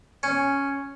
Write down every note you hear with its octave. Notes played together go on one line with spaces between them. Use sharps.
C#4